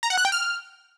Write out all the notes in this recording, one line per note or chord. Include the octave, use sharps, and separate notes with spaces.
A#5
F#5
F#6
G5
F6